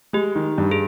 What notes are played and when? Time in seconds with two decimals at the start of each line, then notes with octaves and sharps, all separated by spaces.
0.13 G#3 G4
0.36 D#3
0.58 G2
0.71 G#4